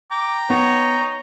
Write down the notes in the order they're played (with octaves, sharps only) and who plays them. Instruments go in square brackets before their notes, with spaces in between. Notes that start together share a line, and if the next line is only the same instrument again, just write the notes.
[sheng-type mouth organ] G5 A#5 [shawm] D6
[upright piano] B3 [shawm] D#4 [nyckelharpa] C#5